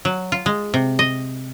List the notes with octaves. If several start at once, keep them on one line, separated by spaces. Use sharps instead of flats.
F#3
F4
G#3
C3
D#5